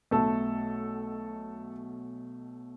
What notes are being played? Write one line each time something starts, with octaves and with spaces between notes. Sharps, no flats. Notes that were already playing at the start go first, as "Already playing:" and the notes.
B1 B2 A3 A4